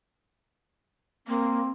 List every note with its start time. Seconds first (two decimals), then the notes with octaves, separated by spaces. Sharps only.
1.28 A#3 C4